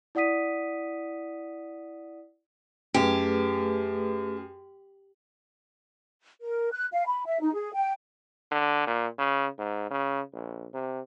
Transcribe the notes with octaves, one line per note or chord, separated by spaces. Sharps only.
E4 D5 F#5 D#6 B6 D#7
F#2 A3 G4 G#4 B4
A#4
F#6
F5
B5
E5
D#4
G#4
G5
D3
A#2
C#3
G#2
C#3
A#1
C3